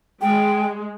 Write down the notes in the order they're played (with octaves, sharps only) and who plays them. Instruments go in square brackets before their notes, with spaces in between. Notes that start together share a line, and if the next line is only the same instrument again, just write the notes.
[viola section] G#3 [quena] G5